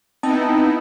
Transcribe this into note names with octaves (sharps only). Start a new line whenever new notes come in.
B3 C4 D#4 E4 A5